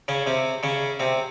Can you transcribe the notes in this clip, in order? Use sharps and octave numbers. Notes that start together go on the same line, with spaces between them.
C#3 C#4
C3 C4
C#3 C#4
C3 C4